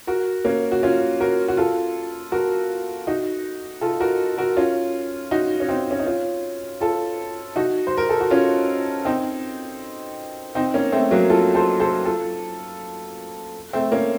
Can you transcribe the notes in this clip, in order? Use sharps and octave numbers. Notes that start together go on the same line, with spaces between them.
F#4 A#4
A#3 C#4
F#4
C#4 F4
F#4 A#4
F#4
F4 A4
F#4 A#4
D#4 F#4
F4 A4
F#4 A#4
F#4 A#4
C#4 F4
D#4 F#4
C#4
C4 D#4
C#4
D#4
C#4 F4
F4 A4
D#4 F#4
C5
A#4
A4
F#4
C#4 F4
C4 D#4
C4 D#4
A#3 C#4
A3 C4
F#3 A#3
F4 A4
A4 C5
A4 C5
F4 A4
A3 C4
A#3 C#4